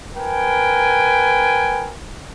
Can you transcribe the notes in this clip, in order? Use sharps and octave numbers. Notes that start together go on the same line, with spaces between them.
A#4 B4 G5 G#5